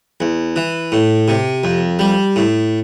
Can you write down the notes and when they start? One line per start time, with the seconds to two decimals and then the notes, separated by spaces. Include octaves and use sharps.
0.20 E2
0.56 E3
0.92 A2
1.28 C3
1.64 F2
1.99 G3
2.36 A2